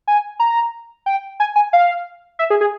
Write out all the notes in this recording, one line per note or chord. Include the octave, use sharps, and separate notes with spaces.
G#5
A#5
G5
G#5
G#5
F5
E5
G#4
G#4